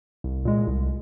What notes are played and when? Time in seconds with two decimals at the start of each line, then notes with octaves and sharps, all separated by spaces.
0.24 C2
0.45 A#2 G#3
0.67 C2